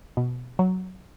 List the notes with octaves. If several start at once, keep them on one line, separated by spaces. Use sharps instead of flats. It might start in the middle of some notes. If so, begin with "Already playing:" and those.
B2
F#3